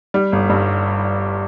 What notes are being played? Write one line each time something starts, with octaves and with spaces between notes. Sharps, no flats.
G3
G1
G2